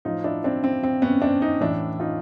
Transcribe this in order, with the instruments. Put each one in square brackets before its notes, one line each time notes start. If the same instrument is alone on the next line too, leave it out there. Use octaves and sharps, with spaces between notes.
[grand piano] A2 F3 D#4 F4
D4 E4
C4 D4
C4
C4
B3 C#4
C4 D4
C#4 D#4
A2 E3 D4 E4
D#4 F4